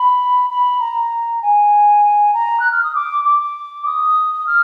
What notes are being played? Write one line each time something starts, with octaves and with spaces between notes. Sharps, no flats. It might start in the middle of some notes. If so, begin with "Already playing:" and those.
Already playing: B5
B5
A#5
G#5
A#5
F#6
F6
D#6
D6
D6
D#6
F6